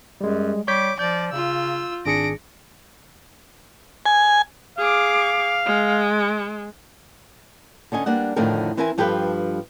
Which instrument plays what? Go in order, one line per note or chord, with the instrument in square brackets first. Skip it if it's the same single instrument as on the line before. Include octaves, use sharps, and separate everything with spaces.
[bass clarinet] F#2 [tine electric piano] G3 G#3
[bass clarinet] G3 [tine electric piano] C#5 G6 B6 [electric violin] D6
[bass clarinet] F3 [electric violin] D5 [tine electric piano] G6
[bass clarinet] C#3 [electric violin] F4 E6
[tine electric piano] G#1 G#4 C#7 [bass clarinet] D4 [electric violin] A#6 D7
[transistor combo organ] G#5
[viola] G#4 D6 [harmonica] F5
[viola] G#3
[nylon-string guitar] D3 C#4 D#5 G#5
G3 A#3 D4 F#5
F2 A2 D3 D#3 C4 A#4
E3 C4 E4 A#4 E5 G#5
G2 F3 G4 A4 B4 G5